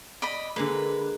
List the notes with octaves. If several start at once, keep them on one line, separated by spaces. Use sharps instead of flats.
D5 D#5 B5
D3 G#3 A#3 B4